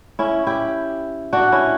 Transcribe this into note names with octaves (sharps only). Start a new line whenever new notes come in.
C#4 E4
E4 G4
D4 F#4
C#4 E4